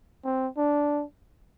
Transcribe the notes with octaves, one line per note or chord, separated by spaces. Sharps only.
C4
D4